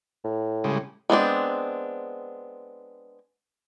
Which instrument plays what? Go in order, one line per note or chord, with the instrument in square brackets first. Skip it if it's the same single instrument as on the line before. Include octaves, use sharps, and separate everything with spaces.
[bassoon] A2
[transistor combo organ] C#3 G3 G#3
[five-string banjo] G#3 B3 C4 D4